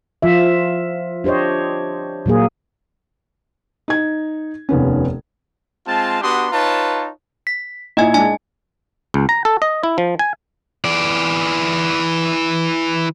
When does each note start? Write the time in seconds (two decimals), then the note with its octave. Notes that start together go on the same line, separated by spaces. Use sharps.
0.22 F3 F4 E5
1.24 D4 G4 C5 C#5 D#5
2.26 A#2 F#3 A#3 G#4
3.88 D#4 G#6
4.69 F1 D#2 B3 C#4
5.87 G#3 C4 F4 A5
6.22 B3 D4 F#4 G4 C6 D#6
6.52 D#4 F4 B4 C#5 A5
7.47 B6
7.97 A#2 D#4 E4 D#5 G#5 G#6
8.14 G#3 D4 G#5
9.14 C#2
9.29 A#5
9.45 A4
9.62 D#5
9.84 E4
9.98 F3
10.19 G#5
10.84 E3 D5